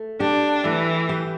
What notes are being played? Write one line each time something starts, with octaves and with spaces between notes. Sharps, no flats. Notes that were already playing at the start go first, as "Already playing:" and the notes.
Already playing: A3
D4 G4
E3 A3
G4